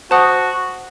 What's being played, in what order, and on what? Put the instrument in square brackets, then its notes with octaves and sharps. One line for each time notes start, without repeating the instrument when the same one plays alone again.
[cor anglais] F#4 [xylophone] C5 F#5 A5 D#6 F#6